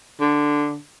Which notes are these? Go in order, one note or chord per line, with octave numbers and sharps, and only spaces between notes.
D3